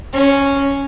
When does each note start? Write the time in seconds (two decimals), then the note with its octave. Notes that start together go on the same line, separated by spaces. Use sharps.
0.13 C#4